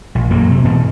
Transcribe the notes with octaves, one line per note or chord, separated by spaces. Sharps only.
A#1
E1 F#2 F#3 A#3
C3
G#2 B2 E3